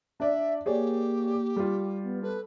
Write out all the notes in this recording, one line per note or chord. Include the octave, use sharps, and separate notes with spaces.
D4 D5 E5
A#3 G4 G#4 C#5 D5
G3 F4
B3
A4 B4